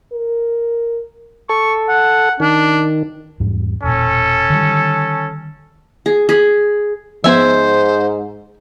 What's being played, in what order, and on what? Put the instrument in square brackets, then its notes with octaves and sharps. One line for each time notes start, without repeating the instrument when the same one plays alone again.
[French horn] A#4
[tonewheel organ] A4 [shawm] C#6
[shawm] F#5
[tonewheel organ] D#3 [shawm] D4
[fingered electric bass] E2 G#2 G3
[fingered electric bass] E1 A#2 [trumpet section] C#4 A4
[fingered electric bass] D3 D#3 G3
[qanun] G#4
G#4 B5
[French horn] G#2 [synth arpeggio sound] F3 B3 [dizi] C5 [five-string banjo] E5 G#5